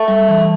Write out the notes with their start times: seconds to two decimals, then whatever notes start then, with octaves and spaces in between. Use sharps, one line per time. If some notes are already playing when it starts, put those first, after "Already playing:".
Already playing: A3
0.08 G3
0.29 E3